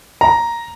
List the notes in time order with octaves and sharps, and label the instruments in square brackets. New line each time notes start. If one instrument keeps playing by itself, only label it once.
[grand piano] A#5